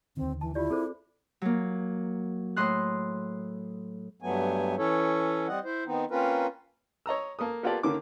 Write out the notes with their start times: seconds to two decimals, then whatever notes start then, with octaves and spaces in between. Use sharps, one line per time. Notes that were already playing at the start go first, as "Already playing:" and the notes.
0.17 D#2 D3 D#3 C4
0.41 E3 A5
0.55 E4 F4 G4 D5
0.70 C4 G#4 A4 C5
1.42 F#3 A#3
2.56 A2 D#5 C6 F#6
4.22 G2 F#3 A3 B3 G#5
4.78 E3 C#4 E4 A4 C#5
5.48 G3 C4 D#5 F#5
5.65 E4 C5
5.86 D#3 B3 C4 D#4
6.11 A#3 C4 C#4 F4 A#4 B4
7.06 C#5 D#5 A#5 E6
7.39 A#3 A4 D#6
7.63 A#3 B3 F4 G4 A4 D5
7.83 D3 D#3 A#3 C#4 D6